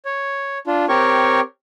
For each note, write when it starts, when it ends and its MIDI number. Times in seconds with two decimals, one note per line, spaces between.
0.05 0.58 73
0.67 0.86 62
0.67 0.86 65
0.89 1.40 60
0.89 1.40 67
0.89 1.40 70
0.89 1.40 73
0.89 1.40 85